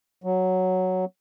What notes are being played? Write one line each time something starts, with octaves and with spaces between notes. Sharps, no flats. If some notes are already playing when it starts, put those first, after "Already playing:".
F#3